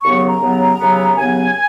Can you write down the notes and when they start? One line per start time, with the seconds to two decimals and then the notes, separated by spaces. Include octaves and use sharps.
0.03 D#2 C#3 F#3 B3 C#6
0.16 C#6
0.29 A#5
0.41 D#2 C#3 F#3 B3
0.79 D#2 C#3 F#3 B3
1.16 D#2 C#3 F#3 B3 G#5